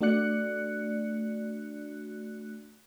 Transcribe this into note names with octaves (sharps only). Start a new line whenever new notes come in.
A3 D4 F#4 D5 F#6 C#7